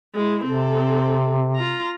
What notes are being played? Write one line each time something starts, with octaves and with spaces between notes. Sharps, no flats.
G#3 E4
C3 C4 A4
F4 A#5